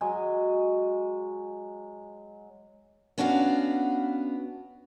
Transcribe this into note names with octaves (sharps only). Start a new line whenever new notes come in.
F#3 G#3 D#5 G#5
B3 C#4 D4 F#4 D#5 F5